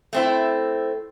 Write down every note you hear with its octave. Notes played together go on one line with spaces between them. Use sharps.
A3 C4 E4